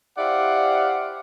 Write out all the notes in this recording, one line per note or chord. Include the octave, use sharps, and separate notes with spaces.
E4 G4 C5 D5 F5 F#5